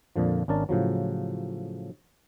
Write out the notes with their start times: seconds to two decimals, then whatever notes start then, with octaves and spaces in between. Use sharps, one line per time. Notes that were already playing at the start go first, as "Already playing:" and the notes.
0.16 F2 A#2 D3 F3
0.48 G#1 C#4 D4 A#4 A5
0.69 A2 C#3 F3 F#3